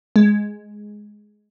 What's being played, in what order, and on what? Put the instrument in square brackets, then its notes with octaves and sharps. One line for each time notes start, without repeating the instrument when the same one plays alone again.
[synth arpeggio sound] G#3